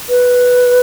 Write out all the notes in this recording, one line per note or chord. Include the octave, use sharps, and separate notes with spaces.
B4